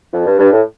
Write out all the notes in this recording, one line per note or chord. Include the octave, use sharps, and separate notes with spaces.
F2
G2
G2
A2